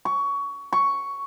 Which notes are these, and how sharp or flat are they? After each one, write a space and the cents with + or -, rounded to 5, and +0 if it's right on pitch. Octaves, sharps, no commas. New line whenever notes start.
C#6 +20
C#6 +5